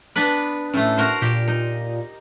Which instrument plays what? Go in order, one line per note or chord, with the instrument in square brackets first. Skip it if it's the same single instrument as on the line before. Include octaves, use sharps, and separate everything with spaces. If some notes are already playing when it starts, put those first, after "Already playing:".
[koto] B3 D4 B4
[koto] A2 A3 [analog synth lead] C#4
[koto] F#4 A#4 C5
[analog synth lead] A#2 [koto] G4
[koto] D#4